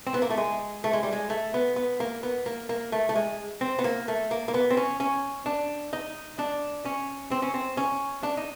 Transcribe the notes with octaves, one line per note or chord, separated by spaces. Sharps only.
C4
B3
A#3
A3
G#3
A3
G#3
G3
G#3
A3
B3
B3
A#3
B3
A#3
A#3
A3
A3
G#3
C4
B3
A#3
A3
A#3
A#3
B3
C4
C#4
C#4
D4
D#4
D4
C#4
C4
C#4
C4
C#4
D4
D#4